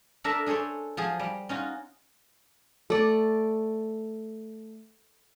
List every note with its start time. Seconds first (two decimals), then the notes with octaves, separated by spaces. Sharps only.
0.24 D4 A4 A#4 E5 A5 A#5
0.46 D4 G#4 A4 C5 C#5
0.97 F3 F#3 G#4
1.19 G3
1.49 C#4 D#4 F4 F#4
2.90 A3 D5